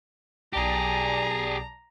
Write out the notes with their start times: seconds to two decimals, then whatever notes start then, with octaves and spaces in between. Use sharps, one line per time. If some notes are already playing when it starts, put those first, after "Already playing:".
0.53 B1 G4 G#4 D5 A5 A#5